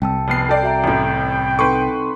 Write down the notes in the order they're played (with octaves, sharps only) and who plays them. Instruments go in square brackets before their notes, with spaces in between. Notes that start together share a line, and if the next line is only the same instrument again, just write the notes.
[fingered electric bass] C2 [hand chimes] G5 A5 E6
[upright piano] F1 B3 C7
[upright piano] A4 D5 [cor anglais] G5
[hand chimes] F#4 E5 A#5
[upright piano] A1 A2 [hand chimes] G6 D7
[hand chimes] C4 D#4 A4 [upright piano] B4 C6 C#6